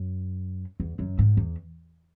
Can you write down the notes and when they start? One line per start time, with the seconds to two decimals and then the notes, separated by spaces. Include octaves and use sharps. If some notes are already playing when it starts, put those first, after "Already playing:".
Already playing: F#2
0.80 E2
0.99 F#2
1.19 G#2
1.37 E2